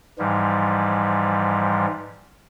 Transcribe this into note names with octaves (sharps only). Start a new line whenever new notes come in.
G#2 E3 F3 G3